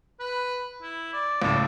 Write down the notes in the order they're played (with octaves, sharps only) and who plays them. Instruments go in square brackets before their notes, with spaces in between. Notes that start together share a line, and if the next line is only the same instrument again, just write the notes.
[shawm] B4
E4
D5
[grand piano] C#2 A2 [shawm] D5